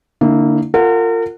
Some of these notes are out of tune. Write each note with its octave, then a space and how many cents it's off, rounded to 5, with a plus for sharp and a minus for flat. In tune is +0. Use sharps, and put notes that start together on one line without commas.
D3 +0 A#3 -25 E4 -35
F4 +0 A#4 -40 F#5 -5